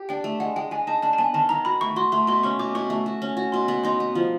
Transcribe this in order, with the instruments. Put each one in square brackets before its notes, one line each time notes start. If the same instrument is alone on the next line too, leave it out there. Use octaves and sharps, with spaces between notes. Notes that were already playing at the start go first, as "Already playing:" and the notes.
Already playing: [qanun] G4
[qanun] D4 [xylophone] G5
[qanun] A3
[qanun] G#3 [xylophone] F#5
[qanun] G#3 [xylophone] G5
[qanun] G#3 [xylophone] G#5
[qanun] D#4 [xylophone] A5
[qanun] D4 [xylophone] A5
[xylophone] A5
[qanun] B3 [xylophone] G#5
[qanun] D#3 [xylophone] A5
[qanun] D#3 [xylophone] A#5
[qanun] F#4 [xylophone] B5
[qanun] A3 [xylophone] C#6
[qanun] F#4 [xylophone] C6
[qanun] A3 [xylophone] C6
[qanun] B2 [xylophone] C6
[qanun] C#4 [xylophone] C#6
[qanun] B2 [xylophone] D6
[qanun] B2 [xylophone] C#6
[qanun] A3
F#4
C#4
F#4
[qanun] B2 [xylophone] C6
[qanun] B3
[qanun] D#4 [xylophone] C6
[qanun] B3
F3